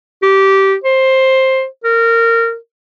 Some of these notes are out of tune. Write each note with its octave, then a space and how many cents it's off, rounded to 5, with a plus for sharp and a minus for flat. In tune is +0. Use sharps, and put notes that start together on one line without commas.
G4 -15
C5 +10
A#4 -20